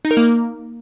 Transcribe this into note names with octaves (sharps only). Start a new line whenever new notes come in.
D#4
A#4
A#3